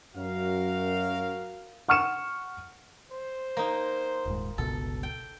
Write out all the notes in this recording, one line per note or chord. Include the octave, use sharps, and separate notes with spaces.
F#2 F#4 A#4 F5
F#5 C#6 F6 C#7 E7
C5
A#3 D#4
D#1 G#2
G1 C#2 B2 A4
G5